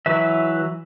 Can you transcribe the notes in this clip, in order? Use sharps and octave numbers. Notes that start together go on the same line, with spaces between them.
E3 F#3 B4 E5